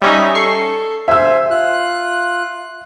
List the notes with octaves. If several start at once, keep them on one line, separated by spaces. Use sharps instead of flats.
G3 C#4 D#4 E5
A4 C#6 C7
C5 E5 G#5 E6
F4 F#6